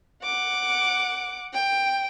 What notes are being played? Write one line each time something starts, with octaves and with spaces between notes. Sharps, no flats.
F#5 D6
G5